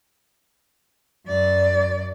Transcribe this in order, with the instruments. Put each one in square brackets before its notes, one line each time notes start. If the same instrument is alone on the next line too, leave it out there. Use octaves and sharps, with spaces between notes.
[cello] F#2 D5